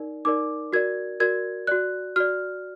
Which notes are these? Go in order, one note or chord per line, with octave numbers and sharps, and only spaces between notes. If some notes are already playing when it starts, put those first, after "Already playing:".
Already playing: D#4 A#4 D5
D#4 A#4 D5 D6
F#4 A#4 D5 G#6
F#4 A#4 D5 G#6
F#4 D5 F#6
F#4 D5 F6